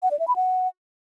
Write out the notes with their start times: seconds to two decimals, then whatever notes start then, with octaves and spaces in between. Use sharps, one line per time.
0.03 F#5
0.11 D5
0.19 E5
0.28 B5
0.36 F#5